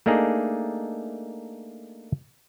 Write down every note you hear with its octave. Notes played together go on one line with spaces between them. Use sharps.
A3 A#3 D4 D#4 G#4